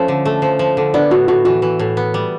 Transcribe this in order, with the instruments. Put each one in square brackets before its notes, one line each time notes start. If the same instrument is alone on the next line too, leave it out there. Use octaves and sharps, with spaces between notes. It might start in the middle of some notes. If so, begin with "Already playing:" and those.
Already playing: [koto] F3 A3 [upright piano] C#4
[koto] D3
A3
F3
F3
D3
[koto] B3 [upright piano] D4
[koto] A2 [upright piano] F#4
[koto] A2 [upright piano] F#4
[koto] E3 [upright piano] F#4
[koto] E3
A2
B3
G3